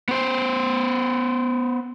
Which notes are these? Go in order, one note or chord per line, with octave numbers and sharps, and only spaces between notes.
B3 C5